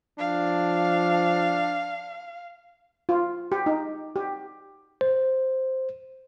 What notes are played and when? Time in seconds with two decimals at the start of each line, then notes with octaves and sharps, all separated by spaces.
0.19 F3 D4 F5
3.09 F4
3.52 G4
3.66 D#4
4.16 G4
5.01 C5